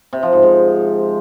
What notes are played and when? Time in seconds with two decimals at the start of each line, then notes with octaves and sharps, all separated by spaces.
0.13 C3
0.23 F3
0.33 G#2
0.43 G#2